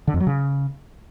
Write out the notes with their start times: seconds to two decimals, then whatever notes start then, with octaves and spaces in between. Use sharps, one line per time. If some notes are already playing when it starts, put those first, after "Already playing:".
0.08 D3
0.14 F2
0.20 F#3
0.27 C#3